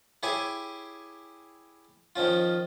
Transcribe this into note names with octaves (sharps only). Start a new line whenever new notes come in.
E4 G4 G#4 C#5 G#5
D#3 F3 C#4 F4